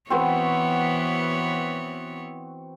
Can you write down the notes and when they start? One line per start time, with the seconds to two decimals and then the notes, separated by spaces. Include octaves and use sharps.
0.10 E3 B3 C4 F#4 B4 C#5